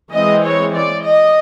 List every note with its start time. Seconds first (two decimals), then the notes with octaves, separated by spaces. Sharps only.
0.12 E3 G#3 C4 D#5
0.44 C#5
0.74 D5
1.05 D#5